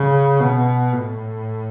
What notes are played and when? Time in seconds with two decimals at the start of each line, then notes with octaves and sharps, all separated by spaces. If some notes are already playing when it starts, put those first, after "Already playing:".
Already playing: C#3
0.40 B2
0.95 A2